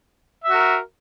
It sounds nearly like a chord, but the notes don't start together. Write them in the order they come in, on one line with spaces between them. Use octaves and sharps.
E5 F#4 A#4